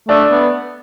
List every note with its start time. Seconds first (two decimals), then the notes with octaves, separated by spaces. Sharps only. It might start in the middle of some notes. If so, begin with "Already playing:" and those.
0.09 A3 D4
0.32 B3